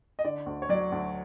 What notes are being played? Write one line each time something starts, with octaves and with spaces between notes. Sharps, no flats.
D#5
D3 D5
D2
C#5
F#3 D5
D2